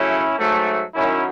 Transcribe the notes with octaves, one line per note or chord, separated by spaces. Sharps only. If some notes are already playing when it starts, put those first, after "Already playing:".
Already playing: C#3 F#3 A3 C#4 E4
G#2 F#3 A3
F#2 D#3 F#3 C#4 E4